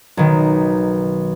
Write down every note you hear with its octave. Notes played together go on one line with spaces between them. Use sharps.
B1 D#3